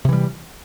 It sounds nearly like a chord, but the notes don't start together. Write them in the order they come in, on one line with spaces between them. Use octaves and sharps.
C3 E3 G3